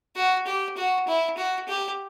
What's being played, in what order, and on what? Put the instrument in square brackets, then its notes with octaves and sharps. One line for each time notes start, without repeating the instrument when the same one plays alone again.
[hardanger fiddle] F#4
G4
F#4
E4
F#4
G4